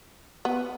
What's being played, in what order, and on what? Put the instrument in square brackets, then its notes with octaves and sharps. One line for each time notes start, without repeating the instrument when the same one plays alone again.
[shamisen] B3